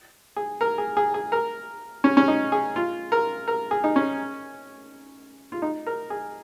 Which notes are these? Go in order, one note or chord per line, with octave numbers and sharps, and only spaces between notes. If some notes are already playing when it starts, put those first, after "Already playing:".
G#4
A#4
G#4
G#4
G#4
A#4
C#4
C#4
D#4
G#4
F4
A#4
A#4
G#4
D#4
C#4
F4
D#4
A#4
G#4